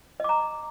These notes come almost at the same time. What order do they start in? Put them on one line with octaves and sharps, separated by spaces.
D#5 D6 A#5